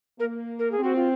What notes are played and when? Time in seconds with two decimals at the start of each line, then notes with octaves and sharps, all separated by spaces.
0.19 A#3 A#4
0.59 A#4
0.72 G#4
0.79 C4
0.84 F#4
0.96 F4